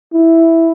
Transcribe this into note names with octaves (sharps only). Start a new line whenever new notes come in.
E4